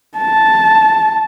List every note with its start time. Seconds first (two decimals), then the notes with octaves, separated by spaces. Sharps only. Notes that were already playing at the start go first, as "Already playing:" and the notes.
0.18 A5